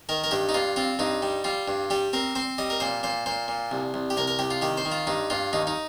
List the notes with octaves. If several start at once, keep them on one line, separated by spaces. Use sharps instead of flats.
D#3 A#4
A#4
G2 G4
D#4
G2 F4
C4 F4
G2 D#4
G3
G3 F4
G2
G3 G4
C4 A#4
C4 C5
G3 D#5
A#4
A#2 C5
A#2 C5
A#2 C5
A#2
C2
C2
G4
C2 A#4
A#4
C2 G4
F4
D#3 G4
C5
D#3
F4
G2 D#4
G2 F4
D#2 D#4
D#4